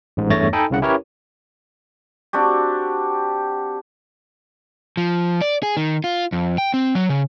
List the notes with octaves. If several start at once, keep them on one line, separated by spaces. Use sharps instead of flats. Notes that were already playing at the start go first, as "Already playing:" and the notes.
A1 G#2
E2 G2 A3 C#5 A6 A#6
D#4 A4 D#5 G5 G#5 B5
C2 C#3 F#5
C#4 E4 G4 A#4 B4 C#5
C4 D4 F#4 G4
F3
D5
G#4
D#3
F4
F2
G5
C4
F#3
C#3